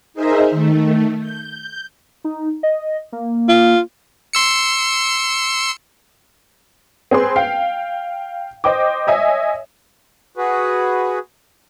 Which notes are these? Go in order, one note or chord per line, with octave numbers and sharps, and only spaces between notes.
D#4 G#4 A#4 C5 D#5 E5
D#3 A3
G6
D#4
D#5
A#3
F4
C6 E6 C#7
C4 G#4 B4 C6
F5 G5 C7
C5 D#5 G5 D6
C#5 D#5 E5 G#5
F#4 G#4 B4